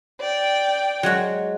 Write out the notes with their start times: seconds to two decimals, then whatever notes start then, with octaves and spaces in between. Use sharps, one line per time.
0.21 D5 G5
1.03 F#3 G#3 F#4